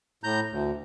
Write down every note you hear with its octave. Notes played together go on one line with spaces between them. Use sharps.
A2 A#5 G6
D2